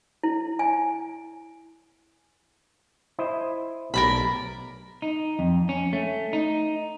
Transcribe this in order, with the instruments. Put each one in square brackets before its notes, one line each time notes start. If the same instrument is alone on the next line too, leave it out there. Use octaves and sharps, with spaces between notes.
[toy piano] E4
G#5
[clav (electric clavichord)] E4 C5 D#5
[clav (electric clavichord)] B1 [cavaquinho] A#4 D5 B5
[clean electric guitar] D#4
F2
C#4
A3
D#4